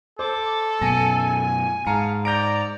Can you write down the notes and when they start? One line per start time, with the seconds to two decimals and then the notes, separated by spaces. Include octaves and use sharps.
0.19 A4 C5 D6
0.81 F#2 B2 G#5 A#6 C#7
1.87 G#2 F5 A5 A#5 C#7
2.25 D5 A#5 G6 A#6 D7